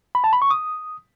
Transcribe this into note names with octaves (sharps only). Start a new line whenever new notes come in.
B5
A5
B5
C#6
D#6